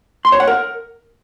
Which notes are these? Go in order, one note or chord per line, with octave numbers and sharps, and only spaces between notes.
C6
C#5
F#5
A#4